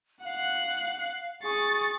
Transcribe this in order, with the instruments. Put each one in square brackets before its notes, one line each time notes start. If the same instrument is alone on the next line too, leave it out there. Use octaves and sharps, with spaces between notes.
[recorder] F5 [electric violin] F#5 F#6
[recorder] G#4 [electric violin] C#6 A6